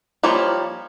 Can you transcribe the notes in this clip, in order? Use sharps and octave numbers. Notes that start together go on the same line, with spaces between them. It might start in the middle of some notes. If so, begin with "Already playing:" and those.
F3 G3 A#3 C#5